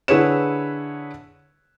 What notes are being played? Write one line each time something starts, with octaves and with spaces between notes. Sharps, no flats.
D3 E4 G#4 B4 C#5 E7